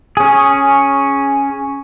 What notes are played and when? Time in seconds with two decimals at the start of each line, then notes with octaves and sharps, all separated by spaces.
0.17 C#4 G#4